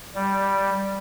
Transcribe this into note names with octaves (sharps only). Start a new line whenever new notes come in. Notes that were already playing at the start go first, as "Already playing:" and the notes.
G3